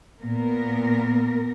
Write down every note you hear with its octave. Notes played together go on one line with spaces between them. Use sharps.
A#2 B3 A#4